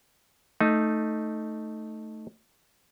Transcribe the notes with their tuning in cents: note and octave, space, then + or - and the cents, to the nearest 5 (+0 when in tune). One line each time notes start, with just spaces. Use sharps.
A3 +0 D#4 +0